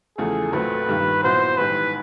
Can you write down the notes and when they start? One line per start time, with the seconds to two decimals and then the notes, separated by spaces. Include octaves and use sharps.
0.18 E2 C#3 F3 A3 G#4
0.53 A#1 A#2 F#3 A3 C4 B4
0.88 G2 D#3 G3 A#3
1.23 A#2 F#3 B3 E4 C5
1.57 A1 G#2 D#3 G3 B4